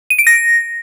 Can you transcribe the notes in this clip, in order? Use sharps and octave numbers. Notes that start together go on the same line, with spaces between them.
D#7
D7
A#6